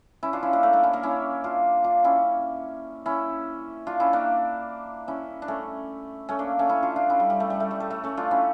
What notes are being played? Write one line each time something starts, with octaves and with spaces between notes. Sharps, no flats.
C#4 E4
D4 F4
C#4 E4
A#3 D4
A3 C#4
A#3 D4
C#4 E4
A#3 D4
C#4 E4
D4 F4
D4 F4
C#4 E4
C#4 E4
D4 F4
C#4 E4
A#3 D4
C#4 E4
D4
A3 C#4
A3 C#4
A#3 D4
A3 C#4
C#4 E4
D4 F4
D4 F4
C#4 E4
G3
G3
A3
G3
A3
G3
A3
A3
A3 C#4
D4 F4
C#4 E4